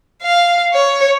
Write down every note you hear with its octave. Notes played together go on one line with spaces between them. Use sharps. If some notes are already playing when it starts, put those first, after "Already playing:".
F5
C#5